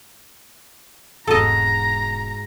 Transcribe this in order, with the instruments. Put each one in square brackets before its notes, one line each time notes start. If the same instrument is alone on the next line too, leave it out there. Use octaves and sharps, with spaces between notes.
[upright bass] E1 [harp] G#2 F#4 [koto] A4 D#5 [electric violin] A#5